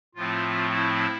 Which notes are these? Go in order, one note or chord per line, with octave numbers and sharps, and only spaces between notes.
A2 F3 A3 C4 F4
E4